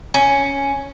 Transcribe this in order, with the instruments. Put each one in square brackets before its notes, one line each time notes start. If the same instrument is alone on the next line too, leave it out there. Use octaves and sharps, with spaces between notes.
[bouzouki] C#4